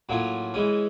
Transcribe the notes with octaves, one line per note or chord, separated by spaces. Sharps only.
A2 F#3 A#3 C#4 F4
E3 G#3 C#4